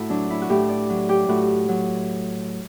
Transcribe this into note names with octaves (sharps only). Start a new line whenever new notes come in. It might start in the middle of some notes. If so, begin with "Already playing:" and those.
Already playing: A2 E4 F#4
F#3 D4
E4
F#4
A2 G4
D5
F#3
G4
A2 F#4
F#3